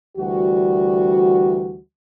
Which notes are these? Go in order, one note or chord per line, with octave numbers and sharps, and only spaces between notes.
D2 E3 G3 F#4